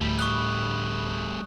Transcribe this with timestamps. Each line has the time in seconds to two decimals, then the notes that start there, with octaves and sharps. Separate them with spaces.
0.01 D2 A2 G3 A3 B5
0.19 C#6 D#6 F#6